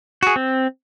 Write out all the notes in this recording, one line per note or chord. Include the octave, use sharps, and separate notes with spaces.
F#4 G#4
C4